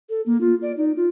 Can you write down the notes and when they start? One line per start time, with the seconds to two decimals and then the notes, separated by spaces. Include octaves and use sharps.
0.10 A4
0.26 A#3
0.41 F4
0.62 D5
0.77 D#4
0.97 F4